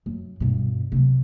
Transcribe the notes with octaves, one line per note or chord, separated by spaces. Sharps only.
F#2
G2 B2
C3 F#3